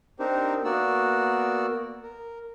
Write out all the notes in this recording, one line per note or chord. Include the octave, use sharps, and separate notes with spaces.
C4 D4 D#4 G4 A#4 C5
A#3 B3 F#4 A#4 D5 E6
A#4